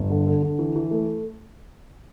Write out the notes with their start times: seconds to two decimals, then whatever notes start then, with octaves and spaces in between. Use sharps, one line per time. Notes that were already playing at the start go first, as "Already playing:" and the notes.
Already playing: G1
0.10 D3
0.27 D3
0.43 D3
0.59 E3
0.76 E3
0.91 A3